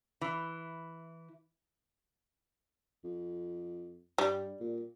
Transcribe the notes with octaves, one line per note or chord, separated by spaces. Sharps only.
E3
F2
G2 G3
A#2